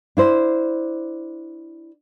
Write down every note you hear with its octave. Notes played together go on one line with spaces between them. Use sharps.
D4 E4 C5